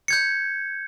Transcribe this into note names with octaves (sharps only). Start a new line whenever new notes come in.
G6 G#6 C#7